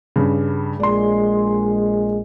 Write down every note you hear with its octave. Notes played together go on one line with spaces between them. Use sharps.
G2 C#3
A#1 G#3 D5 C6